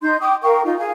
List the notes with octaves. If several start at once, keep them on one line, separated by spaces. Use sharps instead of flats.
D#4 C6 G6
G5 D6 D#6
A#4 F5 G5 C#6
D#4 F4
G#4 F5 G#5